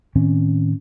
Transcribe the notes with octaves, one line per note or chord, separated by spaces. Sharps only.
A2 D#3 C4 C#4